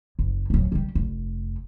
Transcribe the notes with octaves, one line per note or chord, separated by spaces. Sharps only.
F#1
D1 A3
D#3 G3
F1